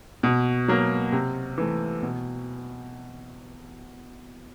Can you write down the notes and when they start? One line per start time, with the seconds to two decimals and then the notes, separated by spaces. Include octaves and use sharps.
0.23 B2
0.68 F#3 A#3
1.12 C3
1.58 E3 A3
2.03 B2